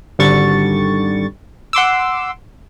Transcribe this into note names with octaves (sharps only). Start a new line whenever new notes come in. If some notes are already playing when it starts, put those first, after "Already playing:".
G#1 D3 G3 C#6 A6
F#5 C6 D6 E6